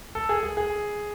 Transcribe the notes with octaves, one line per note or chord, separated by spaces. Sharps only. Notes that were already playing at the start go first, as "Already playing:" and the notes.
A4
G#4
G#4
G#4